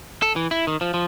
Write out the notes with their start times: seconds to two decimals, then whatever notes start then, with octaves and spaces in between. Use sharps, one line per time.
0.22 A4
0.36 E3
0.51 E4
0.67 D#3
0.81 F3
0.94 F3